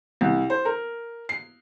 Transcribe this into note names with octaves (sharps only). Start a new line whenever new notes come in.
C2
C5
A#4
C7